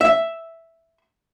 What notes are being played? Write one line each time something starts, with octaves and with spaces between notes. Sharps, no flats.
E5